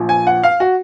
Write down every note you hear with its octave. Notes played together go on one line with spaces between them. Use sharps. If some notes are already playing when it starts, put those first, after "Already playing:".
Already playing: A#1 A#2 F3
G#5
F#5
F5
F#4